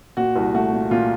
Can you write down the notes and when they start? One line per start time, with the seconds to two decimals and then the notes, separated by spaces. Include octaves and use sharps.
0.17 A#2 F#4
0.36 C2
0.54 A3 F#4
0.73 A#2
0.91 A#2 F4